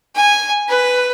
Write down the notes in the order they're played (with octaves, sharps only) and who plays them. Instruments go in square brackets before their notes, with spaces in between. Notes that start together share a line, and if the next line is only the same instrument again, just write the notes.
[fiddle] G#5
B4